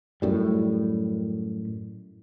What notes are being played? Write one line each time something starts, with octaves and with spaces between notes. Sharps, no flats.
F#2 A2 G3